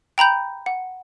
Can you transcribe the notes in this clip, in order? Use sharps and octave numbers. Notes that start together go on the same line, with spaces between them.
G5 A#5 B5 G6
F#5